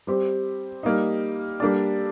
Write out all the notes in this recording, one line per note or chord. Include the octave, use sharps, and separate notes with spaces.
G3 C4 G4
G3 A#3 D#4
G3 A#3 D4 A4 D5